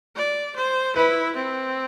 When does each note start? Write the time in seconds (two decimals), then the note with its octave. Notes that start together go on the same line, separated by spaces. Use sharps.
0.16 D5
0.56 C5
0.96 E4 B4
1.36 C4